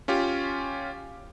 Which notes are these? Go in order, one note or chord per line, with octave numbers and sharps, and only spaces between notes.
C#4 F4 G4